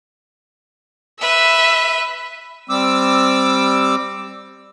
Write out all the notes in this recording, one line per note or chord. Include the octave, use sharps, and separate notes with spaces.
B4 E5
G3 C4 D6 E6